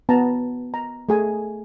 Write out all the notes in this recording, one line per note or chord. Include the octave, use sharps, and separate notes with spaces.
B3 A5 A#5
A#5
A3 G#4 G#5